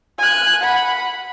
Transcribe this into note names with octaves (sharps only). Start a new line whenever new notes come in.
G#5 F#6
F#5 B5